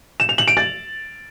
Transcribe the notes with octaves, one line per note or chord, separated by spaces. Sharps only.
E7
F7
F#7
D7
A6